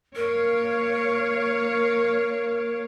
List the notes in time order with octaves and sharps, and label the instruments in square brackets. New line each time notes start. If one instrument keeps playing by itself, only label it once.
[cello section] A#3 C#5 F5 [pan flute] A#4